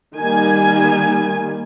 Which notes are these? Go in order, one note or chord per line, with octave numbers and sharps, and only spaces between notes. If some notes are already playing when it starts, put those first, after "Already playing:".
D#3 G3 A#3 G#5